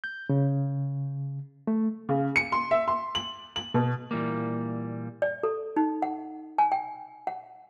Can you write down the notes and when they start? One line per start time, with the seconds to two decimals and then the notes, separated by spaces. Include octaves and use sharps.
0.04 G6
0.29 C#3
1.67 A3
2.09 C#3
2.36 C#7
2.52 C6
2.71 E5
2.88 C6
3.15 F#7
3.56 F#7
3.74 B2
4.11 A#2 E3 G3 A#3
5.22 D5
5.43 A4
5.76 D#4
6.02 F#5
6.58 G#5
6.72 G5
7.27 F#5